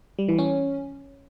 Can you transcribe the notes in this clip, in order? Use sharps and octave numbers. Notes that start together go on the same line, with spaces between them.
G3
E3
C#4